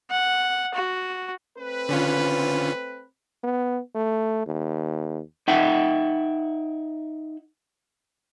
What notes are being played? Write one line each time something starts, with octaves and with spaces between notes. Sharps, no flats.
F#5
F#4
A3 C4 B4
D3 C#4 F4
B3
A3
D#2
D#4 E5 F#5 G5